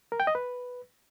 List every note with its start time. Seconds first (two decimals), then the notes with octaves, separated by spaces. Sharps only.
0.12 A#4
0.20 G5
0.27 D#5
0.35 B4